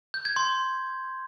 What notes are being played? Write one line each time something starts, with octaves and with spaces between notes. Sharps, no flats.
G6
G#6
C6